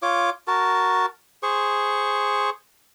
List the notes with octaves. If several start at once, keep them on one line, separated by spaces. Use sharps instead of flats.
F4 C#5 D6
F#4 A#4 A5
G#4 C5 C#6